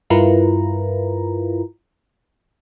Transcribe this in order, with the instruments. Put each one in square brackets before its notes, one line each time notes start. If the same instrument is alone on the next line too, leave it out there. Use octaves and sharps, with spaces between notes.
[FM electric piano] G2 E4 F4 A#4 B4 A#5